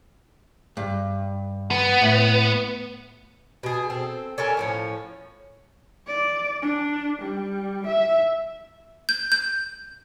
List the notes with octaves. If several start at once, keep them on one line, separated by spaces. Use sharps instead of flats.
G2
B3
A2
B2 G#4
C4 A4
C#4 A4 A#4 G#5
A2 F3 C#4
D5
D4
G3
E5
G6
G6